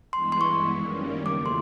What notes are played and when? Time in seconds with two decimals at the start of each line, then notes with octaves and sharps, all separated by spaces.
0.13 G2 E3 G#3 B3 E4 C6
0.32 C6
0.41 C#6
0.69 F#2 D#3 G3 A#3 C#4
1.25 E2 C#3 F3 A3 D6
1.46 C6